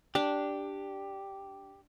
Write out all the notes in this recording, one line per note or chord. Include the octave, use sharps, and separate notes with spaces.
D4 G4